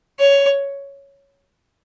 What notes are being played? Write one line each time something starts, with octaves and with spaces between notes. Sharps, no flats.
C#5